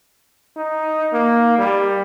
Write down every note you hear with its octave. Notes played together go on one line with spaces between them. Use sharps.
D#4
A#3
G3